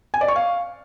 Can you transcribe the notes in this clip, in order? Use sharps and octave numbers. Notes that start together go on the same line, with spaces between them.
G#5
D5
C#6
F5